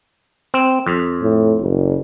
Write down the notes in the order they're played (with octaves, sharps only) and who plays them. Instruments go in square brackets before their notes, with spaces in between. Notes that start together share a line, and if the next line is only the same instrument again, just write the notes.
[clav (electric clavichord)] C4
F2
[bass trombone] A2
F#1